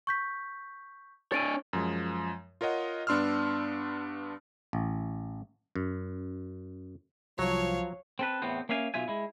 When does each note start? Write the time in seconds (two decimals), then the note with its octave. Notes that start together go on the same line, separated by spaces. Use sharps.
0.07 C#6 G6 B6
1.32 D4 C#5 A6 D7 D#7
1.73 F#2 F3 G#3
2.61 F4 A#4 C#5 D#5 F#5
3.07 G2 B3 D4 C6 E6 F6
4.73 A1
5.76 F#2
7.39 C2 F3 F#3 C#5 F5
8.19 C4 A4 B4
8.42 E2 A2 B3 C4
8.69 A#3 C#4 E5 F5 G#5
8.94 B1 B2 F4 E5 G#5
9.08 G#3 E4